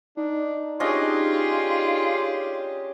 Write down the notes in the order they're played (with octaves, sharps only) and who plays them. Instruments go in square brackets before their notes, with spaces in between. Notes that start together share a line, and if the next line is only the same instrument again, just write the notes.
[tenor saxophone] D4 [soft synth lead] D#4
[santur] C#4 D4 D#5 [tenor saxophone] F4 [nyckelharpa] G4 G#4